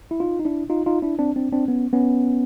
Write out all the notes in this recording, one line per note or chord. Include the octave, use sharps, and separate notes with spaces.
E4
D#4 F4
D#4
D4 E4
D#4 F4
D#4 F4
D4 E4
C4 D4
C4 D4
C4 D4
B3 C#4
B3 C#4